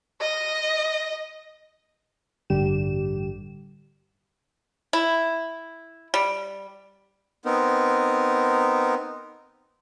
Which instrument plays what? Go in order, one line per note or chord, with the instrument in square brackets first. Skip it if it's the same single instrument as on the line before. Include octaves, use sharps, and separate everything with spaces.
[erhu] D#5
[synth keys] A1 G2 D3 G3 G4 E7
[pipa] E4
G3
[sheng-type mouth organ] B3 C4 D#4 A#4